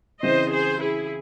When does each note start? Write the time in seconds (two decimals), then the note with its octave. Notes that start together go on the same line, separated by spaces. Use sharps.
0.22 C#3 E3 C4 E4 C5 D#5
0.52 G#4 C5
0.82 E4 G#4